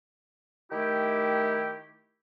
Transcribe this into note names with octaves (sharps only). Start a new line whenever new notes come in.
D#3 A3 E4 G4